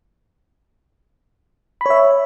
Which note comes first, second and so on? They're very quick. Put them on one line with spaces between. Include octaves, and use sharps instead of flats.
B5 C#5 E5